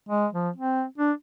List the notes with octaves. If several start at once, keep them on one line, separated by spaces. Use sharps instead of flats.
G#3
F3
C4
D4